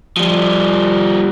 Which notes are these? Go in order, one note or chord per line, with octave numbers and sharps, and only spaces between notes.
F3 G3